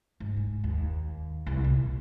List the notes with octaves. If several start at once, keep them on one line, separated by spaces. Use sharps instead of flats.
G#2
G#2
D#2
C2
A#2